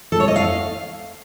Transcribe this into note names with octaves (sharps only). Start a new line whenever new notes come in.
A4
C#5
D#5
F5